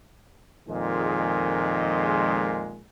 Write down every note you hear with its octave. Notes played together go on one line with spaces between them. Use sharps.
F2 A#2 D#3 G#3